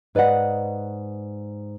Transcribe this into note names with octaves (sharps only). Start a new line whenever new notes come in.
G#2 B4 D5 D#5 F#5